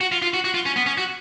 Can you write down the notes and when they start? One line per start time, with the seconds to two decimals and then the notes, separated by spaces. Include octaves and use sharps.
0.01 F#4
0.12 F4
0.22 F4
0.34 F#4
0.45 F#4
0.54 F4
0.66 C#4
0.76 B3
0.86 C#4
0.98 F#4